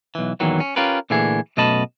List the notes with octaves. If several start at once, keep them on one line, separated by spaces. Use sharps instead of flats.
B1 E3
E2 A#2 D#3 E3 F#3
C#4
C#4 F4 G4 A#4 B4
A#2 D3 E3 A3 G#4
F#2 B2 A3 D#5 A5 B5